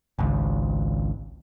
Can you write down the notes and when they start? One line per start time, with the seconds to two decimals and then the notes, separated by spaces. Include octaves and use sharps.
0.19 G#1 C#2